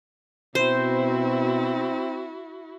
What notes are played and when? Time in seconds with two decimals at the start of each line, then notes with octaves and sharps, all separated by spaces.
0.55 B2 C4 E4 F#4 C5